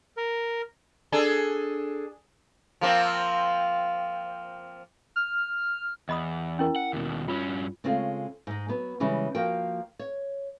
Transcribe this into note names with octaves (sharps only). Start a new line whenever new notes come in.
A#4
D4 G#4 A4
F3 A#3 C4
F6
E2 D#5 B5 D#6
C#4 E4 A#4
F#5
D#2 B2
G2 C#4 F4
C#3 G#3 A3 C4 C#4 F4
G#2 G#3
F#3 B3
C#3 E3 G3 G#3 C#4
F3 A#3 F#4 A#4 G5
C#5